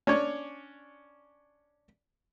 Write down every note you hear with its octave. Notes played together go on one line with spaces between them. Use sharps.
C#4 D4 C#5